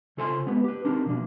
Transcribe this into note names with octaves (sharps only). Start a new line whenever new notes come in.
C#3 F4 A4 C5 G#5 C6
G#3 B3 G4 B4
G4 B4
C4 D4 D#4 G4 A#4
B2 F3 A#3 D4 F#4